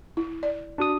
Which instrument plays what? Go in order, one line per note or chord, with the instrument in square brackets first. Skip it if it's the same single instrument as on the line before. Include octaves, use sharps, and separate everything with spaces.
[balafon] E4
D5
[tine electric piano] D4 F#4 D#6